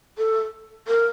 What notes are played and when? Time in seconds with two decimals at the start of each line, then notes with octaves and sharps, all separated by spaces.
0.18 A4
0.88 A#4